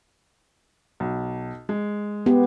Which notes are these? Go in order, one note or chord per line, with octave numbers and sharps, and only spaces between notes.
B1
G#3
B3 G4